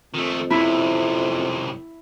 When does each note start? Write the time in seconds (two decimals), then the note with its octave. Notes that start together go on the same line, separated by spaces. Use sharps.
0.14 F2 D#3 A3
0.50 F#2 C3 E4